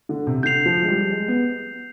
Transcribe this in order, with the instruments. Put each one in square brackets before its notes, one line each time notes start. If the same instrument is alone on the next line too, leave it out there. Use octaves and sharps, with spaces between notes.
[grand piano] D3
C3
[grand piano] D3 [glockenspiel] G6 C7 F7
[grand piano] F3
G#3
G3
G#3
B3